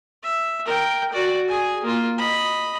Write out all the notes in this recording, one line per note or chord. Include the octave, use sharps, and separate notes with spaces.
E5
A#4 G5
F#4 D5
G#4 G#5
A#3 F4
D#5 B5